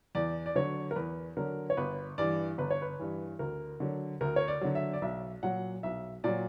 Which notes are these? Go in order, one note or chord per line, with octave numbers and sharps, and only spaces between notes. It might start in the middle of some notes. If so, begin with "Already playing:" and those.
E2 D5
D5
D3 F#3 C#5
A#4
E2 B4
D3 F#3 A#4
C#5
G1 B4
G2 E3 D5
G1 B4
C#5
B4
G2 E3
D2 A#4
D3 F#3
D2 A#4
C#5
D5
D3 F#3
E5
D5
B1 E5
A#2 F#3 F#5
B1 E5
A#2 F#3 D5